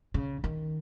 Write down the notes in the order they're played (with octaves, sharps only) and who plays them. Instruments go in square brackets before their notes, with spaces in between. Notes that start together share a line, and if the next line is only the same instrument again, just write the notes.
[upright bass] C#3
D#3